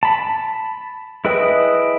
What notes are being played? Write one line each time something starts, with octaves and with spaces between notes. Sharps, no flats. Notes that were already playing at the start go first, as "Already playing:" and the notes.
A5 B5
E4 G#4 B4 D#5 G5